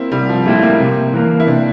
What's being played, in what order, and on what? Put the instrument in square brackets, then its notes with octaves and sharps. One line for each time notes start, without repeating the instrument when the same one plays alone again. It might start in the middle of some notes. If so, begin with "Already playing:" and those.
Already playing: [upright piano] A#3 C4 E4
[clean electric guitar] C2 [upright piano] G3
[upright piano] F3
[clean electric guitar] A#2 A3 E4 G4 [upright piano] G3
[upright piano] A#3
[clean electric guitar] C3
E3 A#3
[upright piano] E4
[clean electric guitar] C3 [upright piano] D4